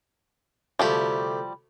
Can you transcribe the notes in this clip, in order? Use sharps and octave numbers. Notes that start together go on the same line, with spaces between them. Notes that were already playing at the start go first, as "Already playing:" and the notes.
D2 C3 F3 G3 A3 G4